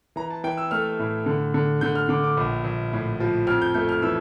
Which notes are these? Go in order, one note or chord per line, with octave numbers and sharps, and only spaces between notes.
E3 A#5
A5
E3 G5
E6
A3 F6
A2
D3
D3
D3 G6
F6
D3 D6
D6
A#1
A#1
A2
F3
F2 F6
G6
A3 G6
F6
E3 E6